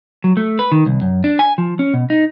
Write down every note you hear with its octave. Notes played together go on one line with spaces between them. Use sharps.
F#3
A3
B4
D#3
C2
F#2
D4
G#5
F3
C#4
B2
D#4